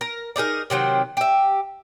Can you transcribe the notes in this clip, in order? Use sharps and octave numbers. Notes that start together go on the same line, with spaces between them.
A#4
D4 D#4 G#4 A#4
C3 D#3 F#3 C4
G4 E5